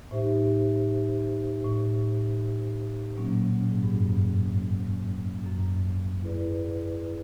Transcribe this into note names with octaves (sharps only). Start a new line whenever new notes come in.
A2 D#4 G4 C5 E5
A2
A#2 F#3 A#3 C#4
G#2
G2
F#2
F#2
E4 G#4 B4 D5